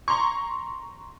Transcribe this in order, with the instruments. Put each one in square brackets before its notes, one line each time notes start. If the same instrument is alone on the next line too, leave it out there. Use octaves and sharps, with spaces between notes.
[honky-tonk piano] A#5 C6 C#6